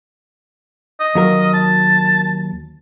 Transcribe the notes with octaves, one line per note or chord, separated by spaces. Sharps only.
D#5
D#2 F#3 A#4
A5